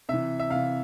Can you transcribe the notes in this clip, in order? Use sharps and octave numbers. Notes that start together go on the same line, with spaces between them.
C3 E3 E5
E5
C3 E3 F5